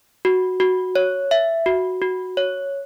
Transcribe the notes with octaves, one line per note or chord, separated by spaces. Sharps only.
F#4
F#4
C#5
E5
F#4
F#4
C#5